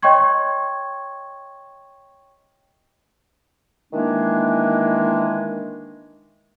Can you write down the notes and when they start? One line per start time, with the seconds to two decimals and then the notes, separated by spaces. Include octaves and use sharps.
0.03 C#5 D#5 G5 C6 C#6 G#6
3.92 D#3 E3 G#3 A#3 D4